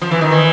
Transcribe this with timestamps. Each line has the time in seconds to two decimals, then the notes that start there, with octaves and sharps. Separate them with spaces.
0.02 F3
0.11 E3
0.21 D#3
0.31 E3